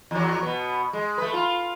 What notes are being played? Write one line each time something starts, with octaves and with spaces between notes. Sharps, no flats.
E2 F#3
B2 B3
G#3
A3 B4
F4